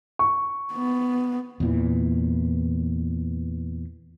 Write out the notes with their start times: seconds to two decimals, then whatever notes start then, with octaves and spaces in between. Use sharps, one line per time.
0.19 C#6
0.73 B3
1.60 E2 A#2 E3